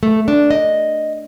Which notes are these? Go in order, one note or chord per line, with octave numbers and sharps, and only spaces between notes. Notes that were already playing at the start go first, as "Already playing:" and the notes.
A3
D4
D#5